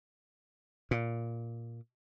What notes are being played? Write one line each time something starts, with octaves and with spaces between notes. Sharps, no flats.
A#2